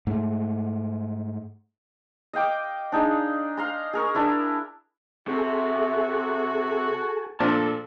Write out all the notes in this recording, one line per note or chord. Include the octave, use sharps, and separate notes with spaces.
G#2 A3
D#5 F5 G5 D6
D4 D#4 G#4 D5
F5 A#5 C6
G#4 A#4 C#6
D4 E4 A#4
C3 F#4 G#4 A4
A#2 F3 D4 A4 A5